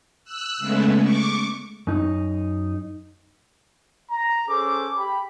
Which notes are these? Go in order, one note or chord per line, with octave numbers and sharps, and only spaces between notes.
E6 F#6
C#3 G#3 A3 B3
C#6 D6
F#2 D#4
A#5
C#4 G#4 A4 C5 D6
G4 B5